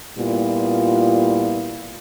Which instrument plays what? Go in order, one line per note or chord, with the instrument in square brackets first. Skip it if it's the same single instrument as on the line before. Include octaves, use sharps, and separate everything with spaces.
[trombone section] A#2 G3 B3 E4 F4